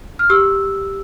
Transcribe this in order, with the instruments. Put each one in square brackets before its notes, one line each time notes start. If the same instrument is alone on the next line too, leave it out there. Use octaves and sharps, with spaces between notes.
[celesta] F6
G4 E6